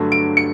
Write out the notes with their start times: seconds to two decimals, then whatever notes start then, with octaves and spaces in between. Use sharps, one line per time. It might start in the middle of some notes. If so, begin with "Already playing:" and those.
Already playing: G2 D3 F#3 A3
0.12 D7
0.37 C#7